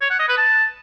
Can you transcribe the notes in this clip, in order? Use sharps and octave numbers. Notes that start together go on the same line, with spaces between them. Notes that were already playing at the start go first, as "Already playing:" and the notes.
C#5
F#5
D#5
B4
A5